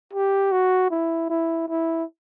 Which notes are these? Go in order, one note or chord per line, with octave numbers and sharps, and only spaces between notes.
G4
F#4
E4
E4
E4